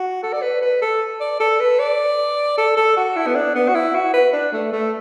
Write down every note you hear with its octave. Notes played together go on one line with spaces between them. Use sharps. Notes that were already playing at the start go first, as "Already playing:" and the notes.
Already playing: F#4
A4
D5
B4
B4
A4
D5
A4
B4
D5
A4
A4
F#4
E4
B3
D4
B3
F#4
E4
F#4
B4
D4
A3
A3